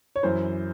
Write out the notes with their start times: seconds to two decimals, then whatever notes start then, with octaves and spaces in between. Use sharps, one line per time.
0.16 C#5
0.23 F#2 E3 C5